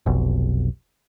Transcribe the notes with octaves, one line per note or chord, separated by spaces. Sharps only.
F1 B1